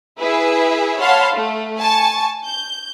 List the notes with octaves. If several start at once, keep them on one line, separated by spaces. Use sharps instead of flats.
E4 G#4 B4 E5
C#5 F5 F#5 A5 B5 C6
A3
G#5 A5 C#6
G6